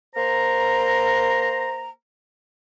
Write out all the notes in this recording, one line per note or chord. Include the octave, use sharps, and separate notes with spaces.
A#3 C5 A#5